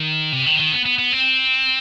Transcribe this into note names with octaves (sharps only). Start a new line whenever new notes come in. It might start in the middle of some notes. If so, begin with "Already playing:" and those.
Already playing: D#3
C3
D#3
D#3
B3
B3
B3
C4